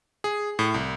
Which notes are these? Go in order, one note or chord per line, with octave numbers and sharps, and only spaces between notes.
G#4
A2
C2